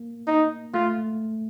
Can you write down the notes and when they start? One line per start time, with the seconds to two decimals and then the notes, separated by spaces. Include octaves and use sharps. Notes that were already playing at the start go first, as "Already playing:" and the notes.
Already playing: A#3
0.27 D#4
0.74 A3 F4